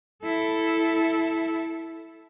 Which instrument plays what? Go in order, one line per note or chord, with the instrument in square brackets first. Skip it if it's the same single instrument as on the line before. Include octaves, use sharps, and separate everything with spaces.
[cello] E4 A4